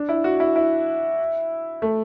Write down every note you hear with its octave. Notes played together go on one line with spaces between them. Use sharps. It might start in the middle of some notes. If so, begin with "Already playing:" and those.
Already playing: D4
E4
F#4
E4
E4
A3